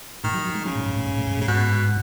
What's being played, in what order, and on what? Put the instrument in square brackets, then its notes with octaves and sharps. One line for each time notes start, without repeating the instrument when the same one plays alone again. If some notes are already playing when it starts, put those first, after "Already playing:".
[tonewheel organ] A2 [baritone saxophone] D#3
[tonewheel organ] F#3
F#3
G#3
[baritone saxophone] C#3 [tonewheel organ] F#3
[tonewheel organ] A2
G#2
A2
G#2
A2
G#2
A2
[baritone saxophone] C#3
[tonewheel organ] G#2 [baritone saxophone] B2